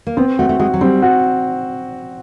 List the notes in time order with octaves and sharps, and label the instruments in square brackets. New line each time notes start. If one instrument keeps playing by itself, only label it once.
[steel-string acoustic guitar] A#3
[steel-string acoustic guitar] B3 [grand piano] C4
[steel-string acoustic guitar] A3 [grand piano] F#4
[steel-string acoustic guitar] A3
[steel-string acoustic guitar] G#3 [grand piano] F#4
[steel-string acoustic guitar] F#3
[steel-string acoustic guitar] G3 [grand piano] C4
[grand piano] F#4